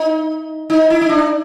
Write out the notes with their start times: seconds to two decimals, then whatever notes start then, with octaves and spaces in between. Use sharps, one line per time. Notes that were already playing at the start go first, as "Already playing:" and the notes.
Already playing: D#4
0.70 D#4
0.90 E4
1.01 D#4
1.09 D4